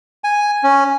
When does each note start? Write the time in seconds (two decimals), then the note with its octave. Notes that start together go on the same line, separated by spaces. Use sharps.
0.24 G#5
0.64 C#4